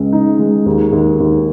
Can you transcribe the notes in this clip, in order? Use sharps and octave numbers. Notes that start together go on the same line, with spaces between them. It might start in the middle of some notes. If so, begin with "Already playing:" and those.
Already playing: C#2 G#3
D#4
G#3
D#2
D#2
D#2